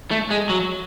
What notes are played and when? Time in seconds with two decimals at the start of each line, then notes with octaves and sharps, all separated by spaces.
0.11 A3
0.31 G#3
0.50 F#3